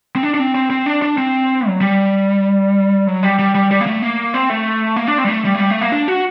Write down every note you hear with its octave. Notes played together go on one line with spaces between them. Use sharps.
C4
D4
D4
C4
C4
C4
D4
D4
C4
F#3
G3
F#3
G3
G3
G3
G3
A#3
A3
A#3
C4
A3
A#3
D4
C4
G3
A3
G3
A3
G3
A3
A#3
D4
F#4